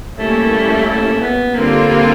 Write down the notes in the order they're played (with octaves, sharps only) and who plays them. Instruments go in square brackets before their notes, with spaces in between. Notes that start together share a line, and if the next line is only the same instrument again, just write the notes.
[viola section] G3 A#3 C#4 E4 [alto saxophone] A3
[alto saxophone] A3
B3
[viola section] D3 G3 C4 F4 [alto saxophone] A#3
[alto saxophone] A#3